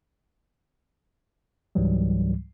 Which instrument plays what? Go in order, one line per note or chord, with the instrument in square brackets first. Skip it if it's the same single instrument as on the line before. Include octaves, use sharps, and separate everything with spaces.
[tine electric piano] C#2 G#2 E3 F#3 G3